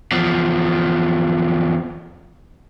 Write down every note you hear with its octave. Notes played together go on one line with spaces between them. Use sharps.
E2 F3